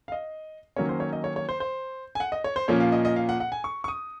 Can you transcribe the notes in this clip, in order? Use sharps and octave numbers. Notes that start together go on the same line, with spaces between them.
F5
D#5
D#3 F#3 A#3 C#4 C#5
C5
C#5
D#5
C#5
C#5
C5
C5
G#5
F#5
D#5
C#5
C5
A#2 F3 A#3 C#4 C#5
F5
D#5
D#5
F5
F#5
F#5
G#5
C#6
C#6
D#6